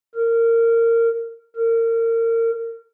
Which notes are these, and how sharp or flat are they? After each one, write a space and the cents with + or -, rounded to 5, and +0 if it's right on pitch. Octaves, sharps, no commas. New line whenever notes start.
A#4 -20
A#4 -30